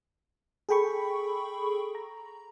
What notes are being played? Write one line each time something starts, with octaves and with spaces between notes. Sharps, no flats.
G#4 A4 G5 B5 C#6
A#5